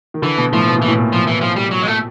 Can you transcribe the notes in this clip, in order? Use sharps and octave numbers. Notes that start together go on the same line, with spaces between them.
D#3
D3 E3
B2
A2 F3
B2
A#2 E3
A2
A#2
F3
E3
F3
G3
F#3
G#3
A3